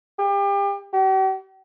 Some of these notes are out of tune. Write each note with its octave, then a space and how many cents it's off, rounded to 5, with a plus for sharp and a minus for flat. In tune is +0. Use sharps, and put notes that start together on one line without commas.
G4 +35
G4 -45